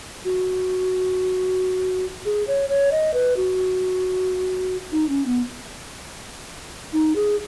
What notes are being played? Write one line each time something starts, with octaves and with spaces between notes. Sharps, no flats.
F#4
G#4
C#5
C#5
D#5
B4
F#4
D#4
C#4
B3
D#4
G#4